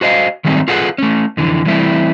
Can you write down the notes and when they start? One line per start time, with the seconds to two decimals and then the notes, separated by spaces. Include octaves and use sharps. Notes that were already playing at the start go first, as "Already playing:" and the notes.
0.01 F#4 C5 D#5 F5
0.44 D#3 F#3 G3 A3 C4 D#4
0.68 F4 G#4 A4 B4 F5 F#5
0.98 A3 C#4
1.37 F2 D3 E3
1.65 E3 G3 A3 C4 E4